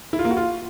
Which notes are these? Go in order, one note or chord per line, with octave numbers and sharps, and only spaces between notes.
E4
F4
A#3
F#4
F4